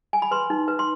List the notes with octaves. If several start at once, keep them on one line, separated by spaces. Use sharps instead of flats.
G#5
B5
B4 C6
D#4
B4
C6